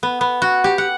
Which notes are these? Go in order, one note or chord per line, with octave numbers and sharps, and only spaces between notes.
B3
B3
F#4
G4
F#5